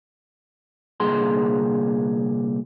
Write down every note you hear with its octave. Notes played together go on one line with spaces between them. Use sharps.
C2 A#2 D3 G#4 G#5 C6